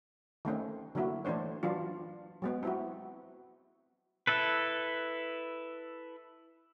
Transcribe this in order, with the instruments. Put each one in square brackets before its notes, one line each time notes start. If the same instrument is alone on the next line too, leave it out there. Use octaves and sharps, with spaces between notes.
[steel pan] D#3 A3 C4 C#4
D3 F#3 A#3 E4 F#4
E3 A3 D4 C5 C#5
E3 F#3 D4 F4
F#3 G#3 B3
C4 E4 F#4
[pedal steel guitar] E4 A4 B4